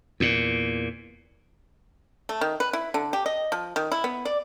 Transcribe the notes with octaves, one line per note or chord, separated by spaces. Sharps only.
E2 A#2
A3
D#3
B4
E4
D3
G4
D#5
F3
D#3
E4
B3
D5